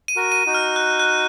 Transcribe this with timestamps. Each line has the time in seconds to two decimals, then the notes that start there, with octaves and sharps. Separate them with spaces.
0.08 D#7
0.16 F#4 A#4
0.32 D#7
0.46 D#4 F#4
0.54 F6
0.76 F#6
1.00 F#6